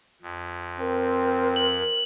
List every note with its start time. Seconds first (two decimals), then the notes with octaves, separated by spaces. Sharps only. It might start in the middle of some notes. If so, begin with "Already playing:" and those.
0.22 F2
0.80 C4 A#4
1.56 F#7